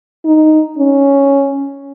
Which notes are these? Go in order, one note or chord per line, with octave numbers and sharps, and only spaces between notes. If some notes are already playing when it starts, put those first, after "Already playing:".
D#4
C#4